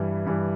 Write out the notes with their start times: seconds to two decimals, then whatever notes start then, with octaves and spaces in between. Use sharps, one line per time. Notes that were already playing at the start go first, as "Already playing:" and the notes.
Already playing: G2 E3 G3
0.26 G2 E3 G3